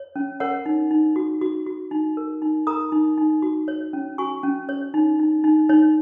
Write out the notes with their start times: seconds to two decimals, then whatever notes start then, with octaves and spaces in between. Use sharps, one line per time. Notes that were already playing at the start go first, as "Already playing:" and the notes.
Already playing: C#5
0.16 C#4
0.40 A#4 C#5 F#5
0.66 D#4
0.91 D#4
1.16 F#4
1.42 F#4
1.66 F#4
1.91 D#4
2.17 A#4
2.42 D#4
2.67 A#4 A#5 D#6
2.92 D#4
3.18 D#4
3.42 F#4
3.68 C#5
3.93 C#4
4.18 F#4 G#5 C#6
4.43 C#4
4.69 C#5
4.94 D#4
5.19 D#4
5.44 D#4
5.69 D#4 C#5